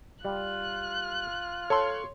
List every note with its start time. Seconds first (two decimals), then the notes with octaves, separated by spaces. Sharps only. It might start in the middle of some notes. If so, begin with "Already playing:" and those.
0.25 G3 F4 F#6
1.70 A4 C#5 C6